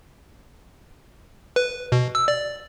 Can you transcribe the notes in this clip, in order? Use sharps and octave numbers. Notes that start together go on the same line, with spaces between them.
B4
B2
E6
D5